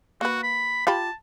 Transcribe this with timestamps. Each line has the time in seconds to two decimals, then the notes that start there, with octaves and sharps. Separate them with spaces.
0.21 A#3 F#4 B4
0.43 B5
0.87 F4 G4 A5 B5